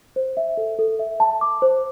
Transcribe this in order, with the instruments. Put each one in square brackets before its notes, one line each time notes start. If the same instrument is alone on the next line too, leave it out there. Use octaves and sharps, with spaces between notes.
[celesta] C5
E5
A4
A4
E5
A5
D6
C5